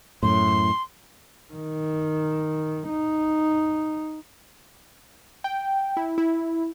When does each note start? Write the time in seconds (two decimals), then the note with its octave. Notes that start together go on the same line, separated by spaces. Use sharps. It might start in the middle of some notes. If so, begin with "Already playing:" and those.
0.23 F#2 A2 C6
1.53 D#3
2.89 D#4
5.44 G5
5.97 E4
6.18 E4